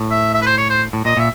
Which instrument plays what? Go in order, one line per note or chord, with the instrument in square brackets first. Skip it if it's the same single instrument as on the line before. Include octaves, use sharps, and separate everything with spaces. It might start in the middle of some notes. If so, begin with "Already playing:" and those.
Already playing: [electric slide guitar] A2
[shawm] E5
E5
B4
C5
C#5
C5
[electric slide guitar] A2
[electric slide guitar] A#2 [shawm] D#5
[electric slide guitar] A#2 [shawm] E5